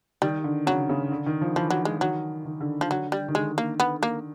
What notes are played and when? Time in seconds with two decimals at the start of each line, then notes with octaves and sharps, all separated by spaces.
0.22 D#3 G3
0.44 D3
0.66 C#3 F#3
0.89 C#3
1.12 D3
1.26 D#3
1.41 F3
1.56 E3 F3
1.70 F#3
1.85 G#3
2.01 D#3 F#3
2.45 D#3
2.60 D3
2.81 F3
2.90 D3 F#3
3.12 G3
3.28 D#3
3.35 D3 G#3
3.58 A#3
3.80 B3
4.03 A#3